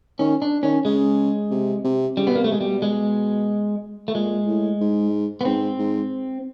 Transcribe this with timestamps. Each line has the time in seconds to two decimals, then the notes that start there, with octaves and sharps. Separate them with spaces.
0.19 D#3 C#4
0.42 D4
0.63 D#3 C#4
0.85 C#3 G#3
1.51 C3
1.84 C3
2.17 C#3 G3
2.27 B2 B3
2.36 A#3
2.39 C3
2.44 A3
2.52 G#3
2.60 B2 G3
2.82 G#3
4.08 A3
4.14 A#2 G#3
4.47 A2
4.81 G#2
5.41 B3
5.45 G#2 C4
5.79 G#2